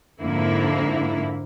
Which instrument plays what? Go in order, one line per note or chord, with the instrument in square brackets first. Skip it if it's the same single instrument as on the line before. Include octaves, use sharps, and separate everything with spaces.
[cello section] F2 G#2 D3 A#3 E4